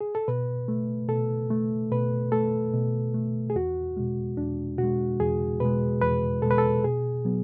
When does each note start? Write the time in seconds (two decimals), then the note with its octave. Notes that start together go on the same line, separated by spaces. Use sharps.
0.01 G#4
0.15 A4
0.28 B2 B4
0.68 A3
1.09 B2 A4
1.51 A3
1.91 B2 B4
2.32 A3 A4
2.74 B2
3.14 A3
3.50 G#4
3.55 E2 F#4
3.97 B2 G#3
4.37 E2 D4
4.78 B2 F#4
4.83 G#3
5.20 E2 G#4
5.60 B2 G#3 B4
6.02 E2 B4
6.42 B2 G#3 A4
6.51 B4
6.58 A4
6.84 B2 G#4
7.25 F#3 B3